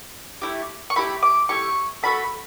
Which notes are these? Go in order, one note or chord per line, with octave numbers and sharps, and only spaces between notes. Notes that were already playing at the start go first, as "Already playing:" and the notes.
A3 E4 G4
C#6
A3 E4 G4 B5
D6
A3 E4 G4 C#6
A3 C#4 F#4 A4 B5